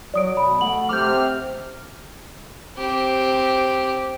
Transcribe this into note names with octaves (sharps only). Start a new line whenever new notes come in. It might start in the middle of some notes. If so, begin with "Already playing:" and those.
F#3 D5 D#6 D7
B2 B5
A3 F#5 F#7
C3 D6 F6 G6
C4 G4